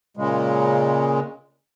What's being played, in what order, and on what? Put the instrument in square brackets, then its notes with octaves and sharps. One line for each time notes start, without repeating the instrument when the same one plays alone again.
[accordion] A#2 C#3 G#3